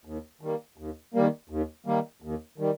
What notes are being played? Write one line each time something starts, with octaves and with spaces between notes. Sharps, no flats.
D#2
D#3 G3 A#3
D#2
D#3 G3 A#3
D#2
D#3 G3 A#3
D#2
D#3 G3